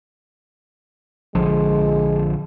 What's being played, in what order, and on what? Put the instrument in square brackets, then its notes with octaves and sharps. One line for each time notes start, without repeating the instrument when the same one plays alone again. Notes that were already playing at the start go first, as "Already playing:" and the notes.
[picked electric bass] A#1 D3 F3 [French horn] G#3